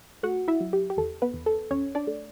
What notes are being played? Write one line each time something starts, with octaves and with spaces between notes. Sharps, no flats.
A3 F#4 F#5
E4 E5
F#3
G4
G4
E2 A4
B3 B4
E2
A4
E2 C#4 C#5
D4 D5
A3